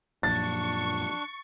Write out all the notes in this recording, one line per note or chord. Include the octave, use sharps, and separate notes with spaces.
F#2 A#2 F3 D4 C#6 A6